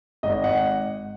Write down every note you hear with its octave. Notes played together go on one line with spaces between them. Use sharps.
G#1 D#5
F#5